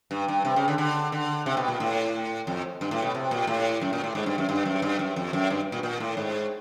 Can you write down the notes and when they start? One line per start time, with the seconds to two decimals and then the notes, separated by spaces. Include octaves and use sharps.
0.11 G2
0.28 G2
0.45 C3
0.56 C#3
0.68 D3
0.78 D3
1.12 D3
1.46 C3
1.57 B2
1.68 A#2
1.80 A2
2.47 F2
2.81 G2
2.91 A2
3.02 B2
3.14 C3
3.31 A#2
3.47 A2
3.82 F#2
3.93 A#2
4.04 A2
4.15 G#2
4.26 G2
4.38 F#2
4.49 G2
4.65 F#2
4.82 G2
4.99 F#2
5.16 F2
5.33 F#2
5.50 G2
5.72 A#2
5.83 A#2
6.00 A2
6.17 G#2